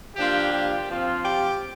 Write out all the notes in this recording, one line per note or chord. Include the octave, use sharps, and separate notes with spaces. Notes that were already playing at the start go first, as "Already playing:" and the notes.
F3 A#3 D4 F4 G4
G4
F3 C4 F4
G4